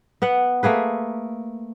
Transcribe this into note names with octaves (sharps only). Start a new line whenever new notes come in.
B3 B4 F#5
A3 A#3 G#4 B4